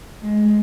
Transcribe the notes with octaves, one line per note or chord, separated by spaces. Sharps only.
G#3